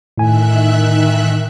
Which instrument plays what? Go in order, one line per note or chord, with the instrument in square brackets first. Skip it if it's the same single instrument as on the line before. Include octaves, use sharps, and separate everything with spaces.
[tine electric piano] A2 G#5 [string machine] D#3 E5 F#6